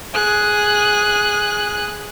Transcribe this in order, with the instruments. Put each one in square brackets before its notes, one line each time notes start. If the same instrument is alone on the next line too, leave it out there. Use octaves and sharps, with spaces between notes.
[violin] G#4 F#6